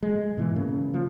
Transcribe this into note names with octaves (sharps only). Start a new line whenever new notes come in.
G#3
G#2 B2 E3
C#3 A#3
F3